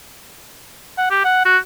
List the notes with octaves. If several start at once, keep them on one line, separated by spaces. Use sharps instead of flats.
F#5
G4
F#5
F#4